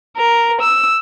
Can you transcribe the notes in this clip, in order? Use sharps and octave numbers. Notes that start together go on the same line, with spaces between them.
A#4
E6